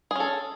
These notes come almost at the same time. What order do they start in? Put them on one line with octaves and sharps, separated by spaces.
G#4 C#4 A4